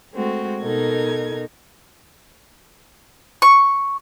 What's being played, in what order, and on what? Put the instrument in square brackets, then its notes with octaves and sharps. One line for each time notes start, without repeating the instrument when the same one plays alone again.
[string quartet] G#3 A3 C4 F#4
B2 D#4 A4 A#4 G#6
[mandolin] C#6